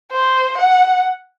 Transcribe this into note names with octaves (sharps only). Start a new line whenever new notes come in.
C5
F#5